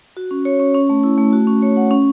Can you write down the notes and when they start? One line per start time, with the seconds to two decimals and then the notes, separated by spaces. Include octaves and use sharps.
0.17 F#4
0.31 C#4
0.45 C#5
0.60 C#4
0.74 C#4
0.90 A3
1.03 E4
1.18 A3
1.33 F#4
1.47 C#4
1.62 C#5
1.77 F#5
1.91 C#4